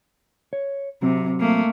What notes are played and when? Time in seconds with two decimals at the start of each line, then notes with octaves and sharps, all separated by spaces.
0.53 C#5
1.02 C3 F#3 C4
1.40 A3 A#3